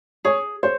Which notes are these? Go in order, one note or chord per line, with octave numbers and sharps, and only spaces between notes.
G#4 C#5
C5 C#5